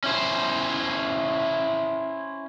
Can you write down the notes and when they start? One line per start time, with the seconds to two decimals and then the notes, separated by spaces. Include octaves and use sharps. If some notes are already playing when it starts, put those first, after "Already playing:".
0.04 C#4 E4 C5